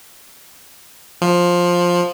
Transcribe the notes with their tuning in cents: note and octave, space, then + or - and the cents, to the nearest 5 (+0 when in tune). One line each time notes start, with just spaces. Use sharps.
F3 +10